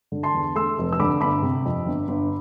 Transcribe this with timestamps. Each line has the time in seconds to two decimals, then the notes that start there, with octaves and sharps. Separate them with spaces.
0.12 D3
0.23 A5 C6
0.34 E2
0.55 A3 C6 E6
0.78 F1
0.92 E6
1.00 D3 B5 D6
1.21 G1 B5 D6
1.42 C3
1.65 F2
1.86 G1
2.08 G1